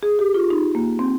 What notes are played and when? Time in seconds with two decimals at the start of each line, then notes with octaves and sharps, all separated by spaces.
0.03 G#4
0.19 G4
0.34 F4
0.50 D#4
0.75 A#3
0.99 C4